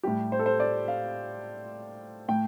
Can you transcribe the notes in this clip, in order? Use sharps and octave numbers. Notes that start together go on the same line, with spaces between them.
A2 G3 G4
C5
A4
C5
D5
F5
A2 G5